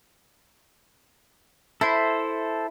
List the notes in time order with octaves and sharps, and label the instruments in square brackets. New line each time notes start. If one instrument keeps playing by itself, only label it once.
[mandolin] E4 [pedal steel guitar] A4 C5